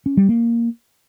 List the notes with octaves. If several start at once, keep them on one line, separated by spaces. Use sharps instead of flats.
C#4
G3
A#3